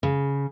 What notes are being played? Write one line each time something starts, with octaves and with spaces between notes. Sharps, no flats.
C#3